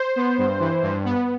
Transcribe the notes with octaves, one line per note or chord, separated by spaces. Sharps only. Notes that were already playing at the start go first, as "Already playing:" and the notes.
Already playing: C5
B3
G2
E3
G2
B3